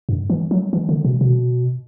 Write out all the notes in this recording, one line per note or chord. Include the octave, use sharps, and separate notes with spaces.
G2
E3
F#3
E3
D3
B2
B2